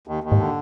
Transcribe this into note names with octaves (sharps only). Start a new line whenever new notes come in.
D#2
D#2
G#2
D3